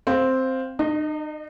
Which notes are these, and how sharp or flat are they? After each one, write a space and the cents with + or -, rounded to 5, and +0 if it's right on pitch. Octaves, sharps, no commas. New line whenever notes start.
C4 +0 F5 +0
D#4 -40 D#5 +0